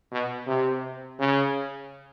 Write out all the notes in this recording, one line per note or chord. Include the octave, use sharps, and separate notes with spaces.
B2
C3
C#3